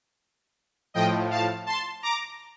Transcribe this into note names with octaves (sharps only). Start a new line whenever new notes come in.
A2 F3 D#5 G5
F5 A5
A5 C6
A#5 D6